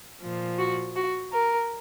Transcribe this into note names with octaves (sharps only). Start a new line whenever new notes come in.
A#2 F3
F#4
F#4
A#4